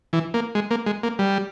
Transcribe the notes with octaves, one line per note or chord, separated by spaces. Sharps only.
E3
A#3
G#3
A#3
G#3
A#3
G3